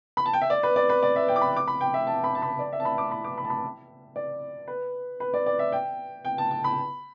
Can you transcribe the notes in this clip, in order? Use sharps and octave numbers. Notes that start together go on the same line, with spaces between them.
B5
A5
G5
E5
D5
B4
D5
B4
D5
E5
G5
D6
B5
D6
B5
G5
E5
A5
B5
A5
B5
D5
E5
A5
B5
D6
B5
D6
B5
A5
B5
D5
B4
B4
D5
D5
E5
G5
G5
A5
A5
B5